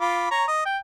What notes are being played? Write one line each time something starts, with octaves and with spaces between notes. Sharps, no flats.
F4 B5 D6
C#5 A#5 C#6
D#5
G5